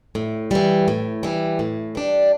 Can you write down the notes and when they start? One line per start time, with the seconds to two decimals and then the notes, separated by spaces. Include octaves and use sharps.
0.15 A2
0.51 E3 G3
0.88 A2
1.23 E3 G3
1.59 A2
1.95 G3 D4